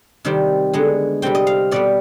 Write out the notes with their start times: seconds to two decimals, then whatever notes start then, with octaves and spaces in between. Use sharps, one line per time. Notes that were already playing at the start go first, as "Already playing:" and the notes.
0.25 C3 D#3 G3 C4
0.74 D3 G#3 B3
1.22 C3 G3 C4 G5
1.35 D#5
1.47 F5
1.71 B2 G3 B3 D5